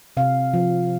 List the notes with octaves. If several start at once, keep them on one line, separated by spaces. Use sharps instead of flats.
C3 F5
F3